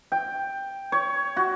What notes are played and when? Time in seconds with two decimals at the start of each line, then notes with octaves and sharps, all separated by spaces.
0.12 G5
0.92 C#5
1.37 F#4